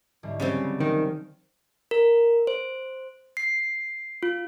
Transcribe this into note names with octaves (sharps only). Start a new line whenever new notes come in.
C2 G#2 D3
C#3 F#3 G3 C4
D#3
A#4
C5
C7
F4